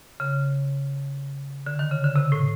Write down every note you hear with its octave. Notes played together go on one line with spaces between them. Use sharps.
C#3
D3
D#3
C#3
D3
C3
A2